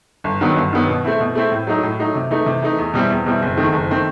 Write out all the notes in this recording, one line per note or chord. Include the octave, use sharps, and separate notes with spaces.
G1
G2 D#3 F#3 B3
G1
G2 D#3 F#3 B3
B2
A3 C4 E4
B2
A3 C4 E4
A2
F#3 A3 D#4
A2
F#3 A3 D#4
C3
E3 A3 D#4
C3
E3 A3 D#4
E2
B2 G3 C4 E4
E2
B2 G3 C4 E4
F#1
E2 D#3 A3 C4
F#1
D#3 A3 C4